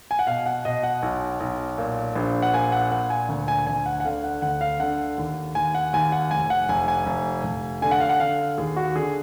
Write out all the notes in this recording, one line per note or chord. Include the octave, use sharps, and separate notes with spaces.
G#5
F#5
B2 F5
F#5
B2 D#5
F#5
B1
B1
A#2
A#1
F#5
A#2 G#5
F#5
A#2 F#5
G#5
D2
G#5
D2 G#5
F#5
F#5
D3 F5
F#5
D2 F#5
F5
D3 F#5
D#2
D#2 G#5
F#5
D#2 G#5
F#5
F1 G#5
F#5
F1 G#5
G#5
F1
F1
D3 G#5
F#5
F5
F#5
D3 F5
D#2 G#4
F#4
D3 G#4